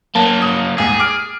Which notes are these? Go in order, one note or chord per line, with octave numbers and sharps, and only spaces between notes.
F#3 A#3 A5
D#6
D#2 G#2 G#4
D6 F6 D7